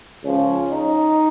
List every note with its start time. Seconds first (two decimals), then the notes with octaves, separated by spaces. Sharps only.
0.23 C#2 C#3 F3 C#4
0.69 D#4